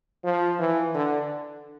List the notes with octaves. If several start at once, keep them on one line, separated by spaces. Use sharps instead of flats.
F3
E3
D3